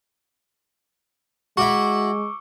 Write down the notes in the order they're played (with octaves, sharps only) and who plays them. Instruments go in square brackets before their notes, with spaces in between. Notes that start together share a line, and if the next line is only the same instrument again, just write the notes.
[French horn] G#3 [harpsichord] E4 F#4 [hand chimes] C#6 D6 E6